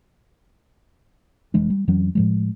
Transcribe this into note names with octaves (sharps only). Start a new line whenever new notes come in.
F1 E3 G#3 D4
G3
F2 E3 F#3 C#4
A2 F3 G#3